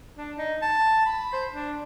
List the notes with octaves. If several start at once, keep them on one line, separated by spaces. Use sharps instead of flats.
D4
D#4
A5
B5
C5
D4